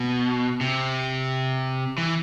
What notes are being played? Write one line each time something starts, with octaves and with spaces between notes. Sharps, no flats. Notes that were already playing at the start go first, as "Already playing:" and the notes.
Already playing: B2
C3
E3